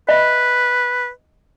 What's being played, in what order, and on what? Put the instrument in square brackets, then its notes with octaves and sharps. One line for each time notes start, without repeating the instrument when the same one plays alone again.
[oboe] B4 [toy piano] D#5 E5 B5